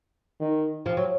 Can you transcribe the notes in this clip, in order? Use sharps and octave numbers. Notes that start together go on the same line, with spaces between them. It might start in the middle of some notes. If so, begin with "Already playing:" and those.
D#3
F3
F#3